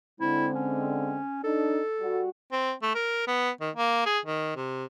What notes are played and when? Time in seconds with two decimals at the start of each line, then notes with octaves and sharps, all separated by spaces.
0.20 D3 G#3 C4 E4
0.55 C#4
1.43 D4 D#4 A4
2.01 G3 F#4
2.52 C4
2.82 A3
2.95 A#4
3.27 B3
3.61 D#3
3.76 A#3
4.06 G#4
4.25 D#3
4.56 C3